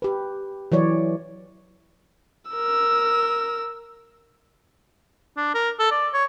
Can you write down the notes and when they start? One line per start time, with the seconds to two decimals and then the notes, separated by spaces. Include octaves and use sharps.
0.02 G4 B4
0.72 E3 F#3 C#5 D5
2.51 A#4 E6
5.37 D4
5.54 A#4
5.79 A4
5.91 D5
6.14 C#5